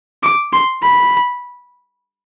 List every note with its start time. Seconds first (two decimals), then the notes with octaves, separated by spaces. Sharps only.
0.23 D6
0.53 C6
0.83 B5